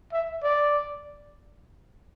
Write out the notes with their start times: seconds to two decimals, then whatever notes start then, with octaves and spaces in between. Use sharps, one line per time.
0.12 E5
0.43 D5